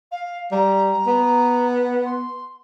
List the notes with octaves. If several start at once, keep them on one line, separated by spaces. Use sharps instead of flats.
F5
G3 A#5
B3
C6